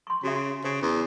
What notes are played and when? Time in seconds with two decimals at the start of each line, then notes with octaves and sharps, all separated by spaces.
0.07 C6 C#6
0.23 C#3 F#4 E5
0.64 C#3 C5
0.82 E2